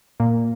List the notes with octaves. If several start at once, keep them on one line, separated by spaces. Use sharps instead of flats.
A#2